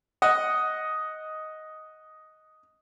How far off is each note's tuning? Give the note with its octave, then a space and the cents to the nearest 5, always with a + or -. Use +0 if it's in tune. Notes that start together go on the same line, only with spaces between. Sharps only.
D#5 +5 F#5 +0